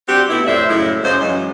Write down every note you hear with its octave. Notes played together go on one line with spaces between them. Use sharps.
C4 D4 F#4 G4
B2 A3 E4
F2 A2 C5 D5 E5
F#2 A2 C#3 G#3 E4
F#2 C#3 F#3 G#3 C5
F#2 E3 F#3 G#3